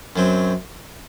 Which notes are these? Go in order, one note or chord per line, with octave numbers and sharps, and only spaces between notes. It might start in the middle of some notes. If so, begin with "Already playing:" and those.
F#2 F#3 C4